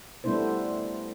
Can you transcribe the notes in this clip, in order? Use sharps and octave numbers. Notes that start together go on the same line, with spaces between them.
G3 A3 B3 D4 E4 C5